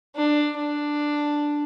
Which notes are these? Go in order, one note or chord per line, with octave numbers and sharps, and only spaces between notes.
D4
D4